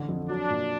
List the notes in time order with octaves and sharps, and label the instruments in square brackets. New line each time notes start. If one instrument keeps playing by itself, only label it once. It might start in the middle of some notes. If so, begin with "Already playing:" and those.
Already playing: [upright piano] A1 D3
F2
[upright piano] F#3 [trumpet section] D4
[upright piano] A#2